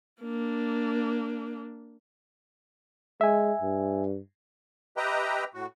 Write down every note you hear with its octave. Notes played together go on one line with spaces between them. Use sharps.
A#3 D4
G#3 E5 G#5
G2
G4 B4 D#5 E5 G5 A#5
A2 F#4